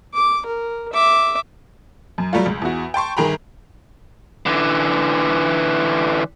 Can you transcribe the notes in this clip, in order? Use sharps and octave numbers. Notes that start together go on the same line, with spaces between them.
D6
A#4
E5 D6
F#2
F#3 G3 A3 F4
C#2
E2 F#4
G5 A5 C6 C#6
G1 D#3 G#4 G5 A#5 B5
D3 E3